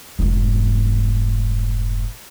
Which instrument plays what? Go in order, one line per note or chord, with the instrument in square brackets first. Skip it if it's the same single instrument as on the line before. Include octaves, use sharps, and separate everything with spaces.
[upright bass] F1 G#2